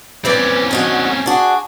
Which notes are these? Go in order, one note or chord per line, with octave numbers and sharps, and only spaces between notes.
C4 C#4 E4 B4 D5
D3 D#4 F#4
D4 F#4 G#4